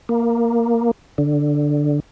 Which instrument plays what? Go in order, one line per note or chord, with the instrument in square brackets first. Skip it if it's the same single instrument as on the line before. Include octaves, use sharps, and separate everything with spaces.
[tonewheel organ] A#3
D3